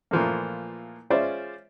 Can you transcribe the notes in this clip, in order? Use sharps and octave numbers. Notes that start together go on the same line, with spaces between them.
A#2 E3 F3 A3 A#3
G#3 C#4 F4 C5 D5 E5